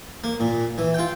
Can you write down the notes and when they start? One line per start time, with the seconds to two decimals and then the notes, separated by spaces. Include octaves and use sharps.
0.24 A#3
0.40 A#2
0.78 E3
0.94 F4 G5